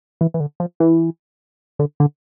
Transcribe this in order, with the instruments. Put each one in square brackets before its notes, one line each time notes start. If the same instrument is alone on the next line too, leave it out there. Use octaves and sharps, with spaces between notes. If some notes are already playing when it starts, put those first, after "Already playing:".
[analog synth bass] E3
E3
D3
F3
E3
D3
D3